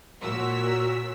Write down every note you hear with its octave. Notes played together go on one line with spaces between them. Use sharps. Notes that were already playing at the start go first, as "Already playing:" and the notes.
A#2 F#4 A#4 C#5 E6 B6